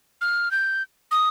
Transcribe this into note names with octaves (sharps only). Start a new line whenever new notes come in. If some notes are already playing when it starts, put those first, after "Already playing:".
F6
G6
D#6